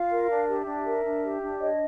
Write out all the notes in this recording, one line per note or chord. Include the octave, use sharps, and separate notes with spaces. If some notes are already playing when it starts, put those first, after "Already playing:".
Already playing: F4 F5
A#4
D4
G4 E5
D4
A#4
D4
G4
D4
C#5 D#5